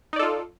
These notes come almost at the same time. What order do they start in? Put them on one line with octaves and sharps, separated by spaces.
D#4 D5 A4 F4